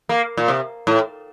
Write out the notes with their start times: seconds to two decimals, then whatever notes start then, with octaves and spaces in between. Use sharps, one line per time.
0.09 A#3
0.37 A#2
0.48 C3
0.87 A2